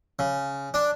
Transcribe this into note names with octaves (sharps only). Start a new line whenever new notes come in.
C#3
D4